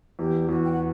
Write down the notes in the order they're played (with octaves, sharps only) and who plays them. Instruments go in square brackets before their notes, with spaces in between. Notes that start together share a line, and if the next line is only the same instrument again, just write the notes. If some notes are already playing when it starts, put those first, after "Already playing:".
[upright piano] E2 [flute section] G4
[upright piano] E2 [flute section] F#4
[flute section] G5
F#5